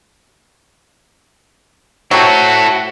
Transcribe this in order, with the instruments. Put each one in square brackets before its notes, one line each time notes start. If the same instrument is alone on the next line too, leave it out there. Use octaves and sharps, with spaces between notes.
[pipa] F#3 C4 [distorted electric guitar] E4 A4 [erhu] F#4